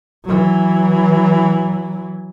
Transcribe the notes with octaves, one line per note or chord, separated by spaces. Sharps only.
E3 F#3